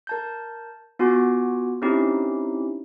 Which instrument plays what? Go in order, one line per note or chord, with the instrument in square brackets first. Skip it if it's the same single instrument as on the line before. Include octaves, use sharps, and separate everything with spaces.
[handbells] A#4 A5 G6
B3 F4 F#4 G#5 D6
C4 C#4 D#4 E4 G4